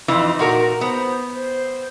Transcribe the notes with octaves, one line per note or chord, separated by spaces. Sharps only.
F2 E3 D#4 F4
A#2 F#4 A#4
B3 C5
C5